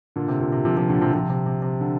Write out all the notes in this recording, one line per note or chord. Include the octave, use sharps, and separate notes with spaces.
A#2 D3
C3
A#2
C3
C3 F3
C3 F3
A#2 D3
C3 F3
C3 F3
C3
C3
C3
D3